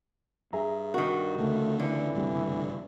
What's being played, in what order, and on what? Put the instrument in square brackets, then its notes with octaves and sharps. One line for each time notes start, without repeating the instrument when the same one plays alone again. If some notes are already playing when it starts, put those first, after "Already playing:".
[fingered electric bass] G2 [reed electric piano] G#4 E5 A#5
[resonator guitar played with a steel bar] D#3 F#4 [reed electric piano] A#4
[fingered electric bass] D2 C#3 [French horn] A3
[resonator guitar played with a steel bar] D3 [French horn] E3
[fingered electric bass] F#1 D2 G2 [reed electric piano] C3 G3